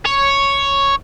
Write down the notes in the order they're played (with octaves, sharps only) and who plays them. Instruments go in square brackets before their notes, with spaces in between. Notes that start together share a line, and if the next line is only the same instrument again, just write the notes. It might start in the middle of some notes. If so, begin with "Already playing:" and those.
[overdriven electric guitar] C#5